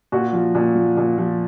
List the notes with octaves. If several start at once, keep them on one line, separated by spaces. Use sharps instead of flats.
A#2 F#4
F3
A#2
F3
A#2
F3